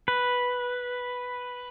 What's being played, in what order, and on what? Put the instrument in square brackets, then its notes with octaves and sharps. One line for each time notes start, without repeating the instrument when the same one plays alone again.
[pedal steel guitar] B4